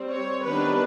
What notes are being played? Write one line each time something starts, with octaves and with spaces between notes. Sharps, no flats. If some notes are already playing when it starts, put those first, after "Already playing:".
Already playing: G3 C4
C#5
D#3 G3 B3 D4 B4